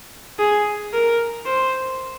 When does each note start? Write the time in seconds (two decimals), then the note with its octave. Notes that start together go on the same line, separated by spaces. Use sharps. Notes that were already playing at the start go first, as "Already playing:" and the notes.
0.39 G#4
0.93 A#4
1.46 C5